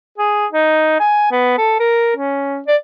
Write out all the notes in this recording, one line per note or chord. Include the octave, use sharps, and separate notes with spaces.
G#4
D#4
G#5
B3
A4
A#4
C#4
D5